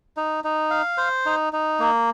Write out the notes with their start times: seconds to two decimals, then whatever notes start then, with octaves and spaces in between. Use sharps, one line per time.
0.17 D#4
0.44 D#4
0.71 F5
0.98 C5
1.26 D#4
1.53 D#4
1.80 A#3